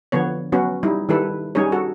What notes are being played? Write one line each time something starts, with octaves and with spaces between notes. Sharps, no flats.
D3 F3 B3 C#5
F#3 B3 C#4 F#4
G3 D#4 E4
D#3 G3 E4 A4 B4
G3 C#4 D#4 G#4 C#5
F#4 A4